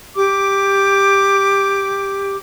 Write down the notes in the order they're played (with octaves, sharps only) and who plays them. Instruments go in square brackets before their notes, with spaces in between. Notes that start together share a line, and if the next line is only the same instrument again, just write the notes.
[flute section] G4 D6